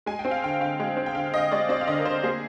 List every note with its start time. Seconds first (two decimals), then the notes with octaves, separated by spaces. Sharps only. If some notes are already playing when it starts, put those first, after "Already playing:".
0.06 G#3 G#5
0.19 G5
0.25 C4
0.31 F5
0.43 D3 G5
0.61 D3 F5
0.80 G#3
0.97 C4
1.06 G5
1.15 D3 F5
1.33 D3 D#5
1.52 G#3 D5
1.69 C4 D5
1.81 F5
1.87 D3 D#5
1.99 A#4
2.05 D3 C5
2.23 A#3 G#4